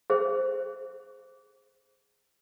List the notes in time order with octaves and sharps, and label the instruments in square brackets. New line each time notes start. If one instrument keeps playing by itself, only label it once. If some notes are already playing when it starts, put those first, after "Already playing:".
[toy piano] G#4 C5